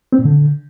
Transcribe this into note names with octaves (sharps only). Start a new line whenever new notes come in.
C4
A#2
D3